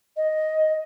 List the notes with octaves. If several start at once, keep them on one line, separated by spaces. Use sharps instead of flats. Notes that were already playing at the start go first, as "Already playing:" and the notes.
D#5